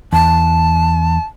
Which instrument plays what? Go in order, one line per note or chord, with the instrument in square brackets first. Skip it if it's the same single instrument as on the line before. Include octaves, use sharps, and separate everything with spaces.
[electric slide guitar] E2 [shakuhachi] A5